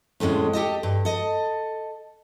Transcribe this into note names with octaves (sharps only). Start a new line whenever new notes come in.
F2 A2 D3 G#3 C#4
G4 A4 D#5
G2
A4 D#5